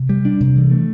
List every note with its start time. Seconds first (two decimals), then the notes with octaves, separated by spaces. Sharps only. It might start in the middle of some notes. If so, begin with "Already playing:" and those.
Already playing: C3
0.09 G3
0.25 D4
0.40 C3
0.56 E3
0.71 A3